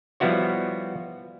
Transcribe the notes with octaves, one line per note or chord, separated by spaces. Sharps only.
F3 G3 B3 E4 F#4 C#5